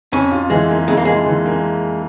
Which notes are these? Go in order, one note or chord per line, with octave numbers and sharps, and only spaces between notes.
F2 C#4
F4
E3 G#3
A#3
F2 G#3
A#3
G#3 F4
E3
A#3